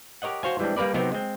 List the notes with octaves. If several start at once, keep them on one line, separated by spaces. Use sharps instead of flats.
G4 A#4 C#5 D#5 F#5
F#4 C5 C#5 F5 G#5
E3 G3 G#3 C4 D4
G3 A#3 A#4 B4 D5
C3 F#3 B3 C4 D#4 A#4
G#3 C4